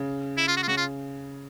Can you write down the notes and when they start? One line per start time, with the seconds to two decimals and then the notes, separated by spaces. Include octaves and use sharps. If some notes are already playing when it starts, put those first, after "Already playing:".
Already playing: C#3
0.37 E4
0.48 F4
0.57 F#4
0.63 F4
0.68 C#3 F#4
0.77 F4